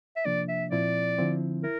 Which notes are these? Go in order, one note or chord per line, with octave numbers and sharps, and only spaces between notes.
E5
C3 F3 A#3 D4 D5
E5
A#2 F3 C4 E4 D5
D3 F3 C4 E4
E4 A#4